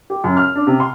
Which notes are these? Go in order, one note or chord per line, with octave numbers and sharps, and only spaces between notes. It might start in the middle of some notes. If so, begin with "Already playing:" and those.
G4
F#2
F6
D4
C3
C6